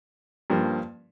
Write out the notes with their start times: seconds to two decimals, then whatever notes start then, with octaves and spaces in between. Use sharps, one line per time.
0.50 G2 F3 A#3